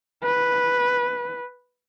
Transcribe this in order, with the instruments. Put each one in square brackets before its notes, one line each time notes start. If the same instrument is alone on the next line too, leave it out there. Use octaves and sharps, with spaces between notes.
[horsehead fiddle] B4